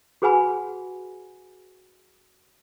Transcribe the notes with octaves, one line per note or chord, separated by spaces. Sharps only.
F#4 G#4 B4 F#5 G#5 B5